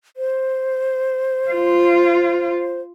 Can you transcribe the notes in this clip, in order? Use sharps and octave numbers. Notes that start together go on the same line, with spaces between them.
C5
F4